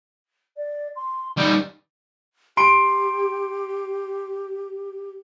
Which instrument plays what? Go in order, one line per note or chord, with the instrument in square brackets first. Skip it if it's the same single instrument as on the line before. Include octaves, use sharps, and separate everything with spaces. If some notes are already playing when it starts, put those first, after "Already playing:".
[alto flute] D5
C6
[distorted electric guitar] G3 D#4 [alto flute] D5
[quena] G4 [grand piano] C6 D7